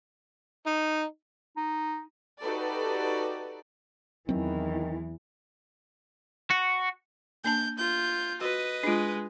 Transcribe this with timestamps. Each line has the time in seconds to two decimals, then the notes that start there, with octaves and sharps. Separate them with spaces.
0.67 D#4
1.57 D#4
2.41 D#4 F#4 G4 A4 B4 D5
4.29 E2 D#3 E3 F#3 C4
6.50 F#4
7.45 A#3 D4 A5 G6
7.78 F4 G6
8.41 F#4 B4 D#5
8.83 G#3 D4 F4